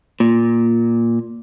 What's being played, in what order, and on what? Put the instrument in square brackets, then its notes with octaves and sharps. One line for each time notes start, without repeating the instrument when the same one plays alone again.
[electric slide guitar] A#2